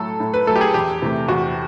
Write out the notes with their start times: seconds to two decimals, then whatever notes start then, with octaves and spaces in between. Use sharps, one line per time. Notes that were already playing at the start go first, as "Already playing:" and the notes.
Already playing: A2 F#3 A3 A4
0.20 A2
0.34 B4
0.47 F#3 A3 A4
0.56 G4
0.61 G#4
0.74 E2 G4
1.02 C3 E3 A3
1.28 E2 F#4